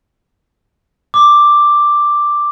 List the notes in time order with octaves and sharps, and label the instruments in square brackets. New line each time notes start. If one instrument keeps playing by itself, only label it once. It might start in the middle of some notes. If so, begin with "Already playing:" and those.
[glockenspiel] D6